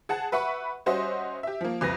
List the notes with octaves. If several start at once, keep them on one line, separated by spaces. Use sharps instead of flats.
G#4 F#5 A5
B4 E5 F#5 B5 C#6
G3 C#4 F#4 C5 D#5 E5
G4 E5
F3 A#3
C2 F2 B4 A#6